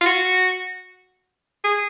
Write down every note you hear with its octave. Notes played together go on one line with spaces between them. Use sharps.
F4
F#4
G#4